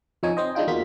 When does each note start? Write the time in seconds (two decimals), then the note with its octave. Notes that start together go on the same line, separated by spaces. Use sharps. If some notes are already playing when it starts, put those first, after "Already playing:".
0.23 F2 F3 D#4 C#5 G#5
0.37 C4 C5 D#5
0.55 G#3 D4 D#4 F4 G5
0.67 E2 A#3 F4 F#4 B6